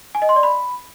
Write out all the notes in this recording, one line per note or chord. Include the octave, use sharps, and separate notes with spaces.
G#5
D#5
C6
D5
B5